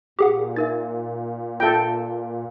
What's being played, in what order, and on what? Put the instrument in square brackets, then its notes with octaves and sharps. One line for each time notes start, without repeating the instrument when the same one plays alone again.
[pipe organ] A#2 [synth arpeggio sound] G4 G#4 F#5
[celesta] D#4 A#4 E5 [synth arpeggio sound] A6
[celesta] F4 E5 [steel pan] A4 G5